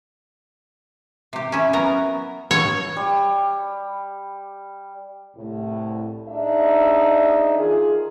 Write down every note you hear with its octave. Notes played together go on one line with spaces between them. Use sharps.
C3 G4
C#4 E4
F#3 B3 A#4 A#5
C#5
G3
C2 A2
D4 D#4 G#4 D#5 E5
D#3 F4 G#4